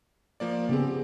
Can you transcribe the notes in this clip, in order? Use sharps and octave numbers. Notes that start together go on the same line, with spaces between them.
F3 A#3 D5
C#3 B3 C4 G4 G#4